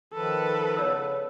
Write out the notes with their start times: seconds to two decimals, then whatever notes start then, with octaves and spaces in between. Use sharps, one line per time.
0.13 D#3 F3 A4 B4
0.77 C#3 B3 C#5 D5 E6